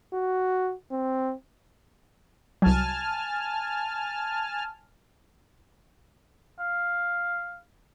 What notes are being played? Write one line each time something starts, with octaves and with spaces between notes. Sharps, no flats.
F#4
C4
C2 F#3 G#5 A5 F6
F5